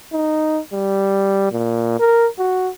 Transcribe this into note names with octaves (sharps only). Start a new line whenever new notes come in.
D#4
G3
A#2
A#4
F#4